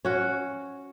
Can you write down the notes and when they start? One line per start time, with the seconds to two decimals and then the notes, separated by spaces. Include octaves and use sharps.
0.05 C#4 F#4